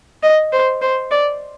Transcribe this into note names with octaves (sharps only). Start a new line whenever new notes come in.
D#5
C5
C5
D5